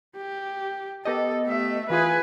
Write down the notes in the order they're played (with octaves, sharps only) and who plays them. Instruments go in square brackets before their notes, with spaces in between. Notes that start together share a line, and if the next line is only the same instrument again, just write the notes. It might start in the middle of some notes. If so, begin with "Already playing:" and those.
[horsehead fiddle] G4
[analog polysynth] B3 G4 D#5 [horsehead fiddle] A4
[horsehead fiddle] A3 E5
[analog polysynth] E3 F4 G#4 [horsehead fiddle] B4 G#5